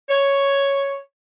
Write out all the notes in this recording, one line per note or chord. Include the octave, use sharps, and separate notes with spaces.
C#5